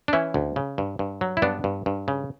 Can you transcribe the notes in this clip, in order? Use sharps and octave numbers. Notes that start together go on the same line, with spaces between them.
D4
E3 C#4 E4
D2
C#3
G2
G2
F#3
E4
G2 B3 D4
G2
G2
C#3